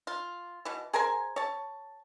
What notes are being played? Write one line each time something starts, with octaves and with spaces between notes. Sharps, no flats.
F4
B2 E3
G#4 A#4 C5 G#5
C#5 A5